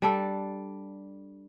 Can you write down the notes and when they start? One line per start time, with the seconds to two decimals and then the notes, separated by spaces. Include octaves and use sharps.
0.02 G3 D4 A4